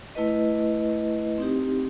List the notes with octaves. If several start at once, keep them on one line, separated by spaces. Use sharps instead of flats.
A3 E4 B4 D#5
C4 D#4 G4